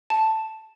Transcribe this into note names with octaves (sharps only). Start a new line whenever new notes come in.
A5